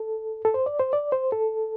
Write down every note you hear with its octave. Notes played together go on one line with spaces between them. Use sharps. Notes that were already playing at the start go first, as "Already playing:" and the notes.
Already playing: A4
A4
C5
D5
C5
D5
C5
A4